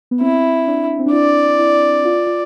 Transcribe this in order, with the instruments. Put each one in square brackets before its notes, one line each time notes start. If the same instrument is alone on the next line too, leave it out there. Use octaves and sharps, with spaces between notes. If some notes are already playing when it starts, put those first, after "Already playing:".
[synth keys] B3
[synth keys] C4 [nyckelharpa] E4
[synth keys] D4
C4
D4
[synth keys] E4 [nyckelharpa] D5
[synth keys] E4
F4
F4